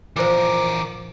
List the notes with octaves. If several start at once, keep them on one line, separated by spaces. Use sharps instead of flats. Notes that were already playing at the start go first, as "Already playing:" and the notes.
A#2 E3 F3 G4 A#4 C5 D6